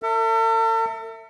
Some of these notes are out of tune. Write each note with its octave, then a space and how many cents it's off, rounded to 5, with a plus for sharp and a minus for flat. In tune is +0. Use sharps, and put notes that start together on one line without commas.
A4 +45 E5 +0